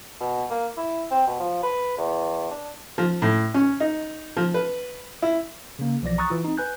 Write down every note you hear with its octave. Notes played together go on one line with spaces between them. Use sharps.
B2
A#3
E4
C4
B2
F3
B4
E2
D4
F3
A2
C#4
D#4
F3
B4
E4
C#3 A#3
B1 E3 F3 D5 A#6
A#5 C#6 D#6 E6 F#6 A6
E3 F4
C4 D#4
B4 G#5 F#6 G6